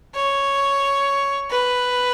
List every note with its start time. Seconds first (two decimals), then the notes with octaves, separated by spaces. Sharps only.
0.15 C#5
1.50 B4